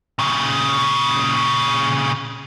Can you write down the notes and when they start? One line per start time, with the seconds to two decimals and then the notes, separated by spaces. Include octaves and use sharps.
0.19 A#2 C#3